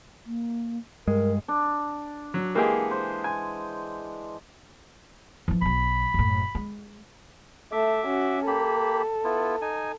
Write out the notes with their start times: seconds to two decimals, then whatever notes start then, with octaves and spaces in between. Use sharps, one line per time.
0.26 A#3
1.07 G2 G#3 A#4
1.48 D4
2.34 F#3
2.55 E3 G#3 A#3 G4 G#4 F#5
2.91 C5
3.24 G#5
5.48 E3 F3
5.62 B1 F#3 B5
6.14 F#1 A2
6.55 G#3
7.72 A3 E5 D6
8.05 C#4 F#4
8.47 A#3 G4 A4 B5
9.24 B3 E4 F4
9.62 D#4 G#5